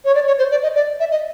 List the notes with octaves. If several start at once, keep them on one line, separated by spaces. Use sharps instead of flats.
C#5
D5
C#5
C5
D5
D#5
D5
E5
D#5